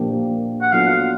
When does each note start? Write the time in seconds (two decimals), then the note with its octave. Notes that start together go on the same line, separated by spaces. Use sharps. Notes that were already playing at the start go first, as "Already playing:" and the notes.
Already playing: A#2 F3 A#3 D4 G4
0.62 F#5
0.72 F#3 B3 D4 F4 A4 F5